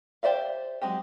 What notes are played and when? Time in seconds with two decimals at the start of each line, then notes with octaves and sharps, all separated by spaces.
0.23 G4 C5 D5 E5 F5
0.82 F#3 G#3 C4 G4